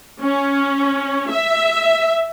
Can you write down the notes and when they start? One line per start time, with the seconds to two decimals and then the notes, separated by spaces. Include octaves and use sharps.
0.22 C#4
1.31 E5